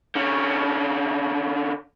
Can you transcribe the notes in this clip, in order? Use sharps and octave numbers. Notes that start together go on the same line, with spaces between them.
D3 C#4